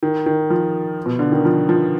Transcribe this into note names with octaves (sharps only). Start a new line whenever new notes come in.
D#3
D#3
F3
B2
D3
D#3
F3
F3